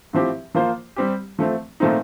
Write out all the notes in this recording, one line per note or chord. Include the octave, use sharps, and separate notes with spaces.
A2 F3 C4 G4
F3 A#3 F4 C5
G3 C4 G4
F3 A3 C4
A#2 F3 A3 C4 D#4